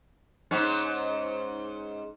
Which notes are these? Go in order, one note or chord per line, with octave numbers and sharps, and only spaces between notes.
G#2 C#4